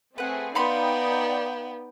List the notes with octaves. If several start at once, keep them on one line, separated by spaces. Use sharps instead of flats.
A3 C4 G#4 B4 F#5
B3 D#4 D5 F5 G5 B5 C6